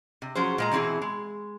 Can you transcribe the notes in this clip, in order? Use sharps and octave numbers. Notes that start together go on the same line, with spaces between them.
C3
F3 F#3 C#4 G#4 C5
A#2 G#3 A#5
B2 E3 C4 E4 G#4
G#3